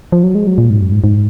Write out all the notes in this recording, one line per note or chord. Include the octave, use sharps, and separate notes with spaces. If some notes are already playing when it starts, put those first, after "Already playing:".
F3
F#3
G#3
F#3
A#2
G#2
F#2
G#2
G#2